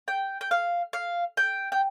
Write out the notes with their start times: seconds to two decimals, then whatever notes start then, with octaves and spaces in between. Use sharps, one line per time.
0.08 G5
0.41 G5
0.51 F5
0.93 F5
1.37 G5
1.72 G5